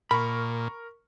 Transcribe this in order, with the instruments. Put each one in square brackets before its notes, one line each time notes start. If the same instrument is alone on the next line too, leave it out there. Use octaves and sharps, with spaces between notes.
[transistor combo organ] A#2 [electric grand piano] A#4 C#6 [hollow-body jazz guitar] B5